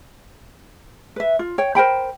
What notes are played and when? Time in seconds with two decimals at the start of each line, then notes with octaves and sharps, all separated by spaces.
1.16 B4 E5
1.39 F4
1.58 C#5 G5
1.75 A#4 C5 G5 B5